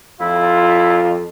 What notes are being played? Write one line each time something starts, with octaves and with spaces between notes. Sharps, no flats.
F2 E4 F4